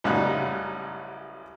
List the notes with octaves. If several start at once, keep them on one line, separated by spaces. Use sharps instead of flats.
A1 F#2 C#3 G3 D#4 F#5